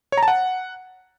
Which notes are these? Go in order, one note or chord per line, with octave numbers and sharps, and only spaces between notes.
C#5
A#5
A5
F#5